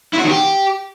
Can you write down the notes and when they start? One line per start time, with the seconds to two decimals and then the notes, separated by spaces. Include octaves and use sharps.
0.13 E4
0.18 F#4
0.24 D#3
0.29 G4